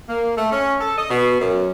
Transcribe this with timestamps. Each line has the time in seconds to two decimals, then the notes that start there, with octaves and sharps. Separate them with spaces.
0.09 A#3
0.37 A3
0.52 C#4
0.80 A4
0.98 D#5
1.10 B2
1.41 F#2